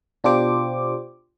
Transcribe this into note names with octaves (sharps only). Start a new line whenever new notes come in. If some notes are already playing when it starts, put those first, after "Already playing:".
B2 D4 F4 G4 C5 D6